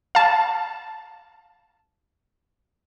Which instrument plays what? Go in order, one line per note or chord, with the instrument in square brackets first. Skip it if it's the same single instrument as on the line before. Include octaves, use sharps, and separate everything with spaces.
[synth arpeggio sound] F5 A5